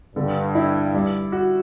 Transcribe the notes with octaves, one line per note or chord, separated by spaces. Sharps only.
G2 D3
E4
G3
F#4